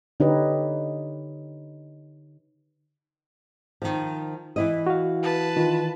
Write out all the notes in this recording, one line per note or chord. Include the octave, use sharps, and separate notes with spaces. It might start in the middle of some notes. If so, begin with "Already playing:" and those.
D3 D#4 G4 B4 C#5 D#5
D#3 F3
E3 E4 D#5
F#4 F5
B4 A5
D#3 F4